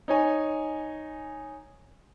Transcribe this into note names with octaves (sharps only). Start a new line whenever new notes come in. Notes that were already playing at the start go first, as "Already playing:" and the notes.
D#4 C#5 G#5